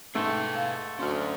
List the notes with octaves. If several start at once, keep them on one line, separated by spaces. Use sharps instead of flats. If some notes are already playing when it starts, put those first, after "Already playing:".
G#2 A3 G#4 B4 G5
F5
D2 C#4 F#4 C6 F6